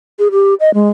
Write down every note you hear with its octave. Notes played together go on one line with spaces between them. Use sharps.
G#4
G4
D#5
G#3